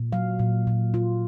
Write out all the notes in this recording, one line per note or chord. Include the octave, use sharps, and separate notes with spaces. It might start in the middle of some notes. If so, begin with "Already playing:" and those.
Already playing: A#2
F#3 F5
A#2
A#2
F4